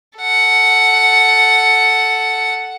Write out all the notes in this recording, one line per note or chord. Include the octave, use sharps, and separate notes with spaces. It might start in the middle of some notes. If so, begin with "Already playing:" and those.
A4 F#5